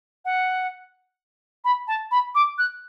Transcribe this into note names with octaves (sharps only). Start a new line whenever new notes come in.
F#5
B5
A5
B5
D6
F#6